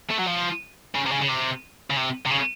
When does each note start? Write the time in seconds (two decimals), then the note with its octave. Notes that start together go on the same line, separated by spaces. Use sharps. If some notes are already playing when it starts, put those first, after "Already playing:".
0.11 A3
0.19 F#3
0.27 F3
0.95 C#3
1.07 C3
1.12 C#3
1.22 C#3
1.29 C3
1.90 C#3
1.97 C3
2.26 C3
2.31 C#3